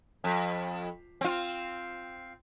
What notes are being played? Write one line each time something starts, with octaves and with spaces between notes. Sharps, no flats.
F2
C4 F4